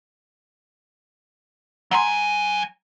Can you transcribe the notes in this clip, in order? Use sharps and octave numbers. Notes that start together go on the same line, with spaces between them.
F#3 F#5 G#5 A#5 C6